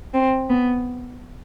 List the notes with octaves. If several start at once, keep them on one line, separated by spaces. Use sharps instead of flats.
C4
B3